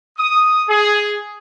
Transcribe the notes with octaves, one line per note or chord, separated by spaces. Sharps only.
D#6
G#4